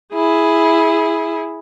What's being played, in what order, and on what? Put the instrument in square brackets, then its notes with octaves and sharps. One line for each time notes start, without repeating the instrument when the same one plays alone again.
[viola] E4 G#4